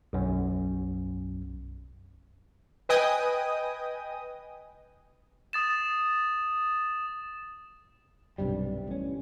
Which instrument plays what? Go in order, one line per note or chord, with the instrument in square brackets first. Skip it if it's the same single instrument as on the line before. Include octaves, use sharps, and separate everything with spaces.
[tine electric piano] B1 F#2
[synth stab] B4 D#5 G5 G#5 D#6
[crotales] D#6 A6 E7
[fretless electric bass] B1 G2 C3 G3
A1 C#4